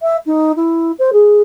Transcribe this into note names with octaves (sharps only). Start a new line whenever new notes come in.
E5
D#4
E4
C5
G#4